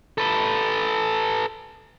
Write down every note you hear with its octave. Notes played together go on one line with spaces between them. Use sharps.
A4 B4